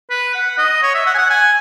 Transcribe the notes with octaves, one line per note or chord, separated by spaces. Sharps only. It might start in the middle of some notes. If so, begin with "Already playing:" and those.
B4
F#5
D#5
C#5
E5
F#5
G#5
F#5
G#5